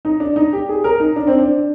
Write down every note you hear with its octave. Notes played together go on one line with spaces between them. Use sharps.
D#4
D4
D#4
G4
G#4
A#4
D#4
D4
C4
D4